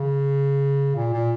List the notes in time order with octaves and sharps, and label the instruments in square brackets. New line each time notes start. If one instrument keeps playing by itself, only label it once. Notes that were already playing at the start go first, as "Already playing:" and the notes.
Already playing: [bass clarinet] C#3
A#2
A#2